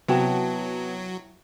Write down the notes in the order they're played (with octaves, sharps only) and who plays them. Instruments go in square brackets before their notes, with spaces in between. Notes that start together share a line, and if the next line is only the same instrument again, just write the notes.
[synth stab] C3 F#4 [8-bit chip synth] F#3 [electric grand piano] B3 [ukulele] E4 G5 A5